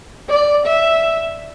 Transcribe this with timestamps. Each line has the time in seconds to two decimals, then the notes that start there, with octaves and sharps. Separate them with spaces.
0.30 D5
0.66 E5